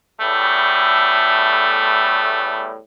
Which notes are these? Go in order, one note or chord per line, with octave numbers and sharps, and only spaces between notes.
E2 A2 G3 A3